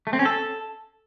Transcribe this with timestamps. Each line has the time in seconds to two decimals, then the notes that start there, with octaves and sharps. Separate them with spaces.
0.07 A3
0.13 C4
0.19 C#4
0.25 A4